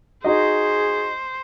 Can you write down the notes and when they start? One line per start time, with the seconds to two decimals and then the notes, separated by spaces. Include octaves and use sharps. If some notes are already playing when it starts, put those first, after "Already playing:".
0.24 D#4 F#4 G#4 C5 D#5